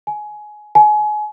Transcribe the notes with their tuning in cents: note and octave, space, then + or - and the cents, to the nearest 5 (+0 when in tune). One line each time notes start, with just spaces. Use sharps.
G#5 +20
G#5 +30